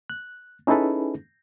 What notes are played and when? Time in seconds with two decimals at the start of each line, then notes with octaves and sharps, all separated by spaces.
0.10 F#6
0.67 C#4 D#4 E4 G#4 A4 B4